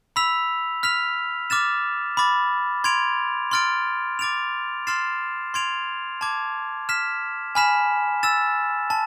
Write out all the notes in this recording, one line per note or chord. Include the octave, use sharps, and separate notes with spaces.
B5 E6 B6 F7
F6 B6 F7
D6 F6 A6 E7
B5 D6 A6
C6 G#6 D7 F7
C6 F6 A6 D7
D6 A6 D7 F7
C6 F6 A6 C7 E7
C6 G#6 D7 F7
A5 D6 G#6
F6 B6 E7
G#5 B5 F6 B6 E7
E6 A6 E7
A5